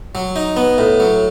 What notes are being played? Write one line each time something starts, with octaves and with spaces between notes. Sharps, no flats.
F#3
D#4
B3
A2
F#3